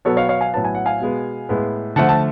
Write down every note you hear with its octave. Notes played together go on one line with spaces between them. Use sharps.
B2 F#3 B3 A4 C#5
C#5 F5
C#5 F5
F5 G#5
A2 F#3 B3 A5
G#5
F#5
F5 G#5
B2 G#3 B3
A2 G#3 B3
D3 F3 A3 F#5 A5
A5